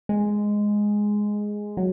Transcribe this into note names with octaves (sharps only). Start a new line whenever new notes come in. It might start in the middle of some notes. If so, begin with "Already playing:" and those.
G#3
F#3